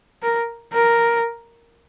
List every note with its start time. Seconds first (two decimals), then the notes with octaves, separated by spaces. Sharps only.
0.22 A#4
0.73 A#4